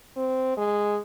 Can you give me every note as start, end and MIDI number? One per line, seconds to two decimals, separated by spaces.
0.16 0.56 60
0.57 0.98 56